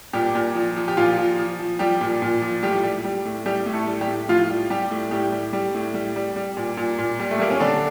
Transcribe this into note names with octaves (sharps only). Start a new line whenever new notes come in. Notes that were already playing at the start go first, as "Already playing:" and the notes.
A#2 G3 G4
A#2
F3
F3
G4
A#2 F3 F4
F3
F3
F3
F3 G3 G4
A#2
A#2
F3
A2 G3 G4
G3
G3
A2
G3 G4
A2
A3 A4
G3
G3 G4
A2
A2 F3 F4
G3
G3 G4
A2
A2 G3 G4
G3
G3
A2
G3
G3
G3
A#2
A#2
A#2
G3
A3
G3 A#3
C#4
D3 G3 D4